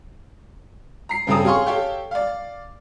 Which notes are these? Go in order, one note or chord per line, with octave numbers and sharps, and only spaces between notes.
A#5 C7
G2 C#3 C4 A4 A#5 D#6
G#4 C#5 F5 C6 C#6
G4 A4 C#5 F5 G5
D5 F5